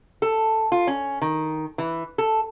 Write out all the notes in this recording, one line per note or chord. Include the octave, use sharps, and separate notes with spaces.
A4
F4
C#4
D#3
E3
A4